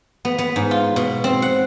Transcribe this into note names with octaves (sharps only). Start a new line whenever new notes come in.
B3
B3
G#2
F4
B2
C4
F#5